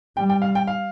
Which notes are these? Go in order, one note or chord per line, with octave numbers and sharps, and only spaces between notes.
G3 G5
G5
F5
G5
F5